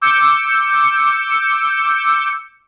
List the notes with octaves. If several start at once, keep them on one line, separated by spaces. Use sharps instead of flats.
D6 E6 G6 C#7